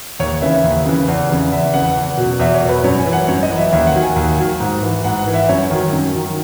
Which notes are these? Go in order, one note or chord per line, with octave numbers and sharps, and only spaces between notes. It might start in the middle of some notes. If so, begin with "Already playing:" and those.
D#2 C#5
C#3 E3 E5
D#2
C#3 E3
E2
C#3 E3
E2 E5
C#3 E3 F#5
E2
B2 F#3
E2 E5
C#5
B2 F#3
B4
F#2 C#5
G#5
E3
F#5
F#2 C#5
D#5
E3
E5
D#2 E5
F#5
D#3 F#3
G#5
D#2
D#3 F#3
G#2
E3
G#2 F#5
F#5
E3
E5
F#2 C#5
D#3 F#3
F#2
D#3 F#3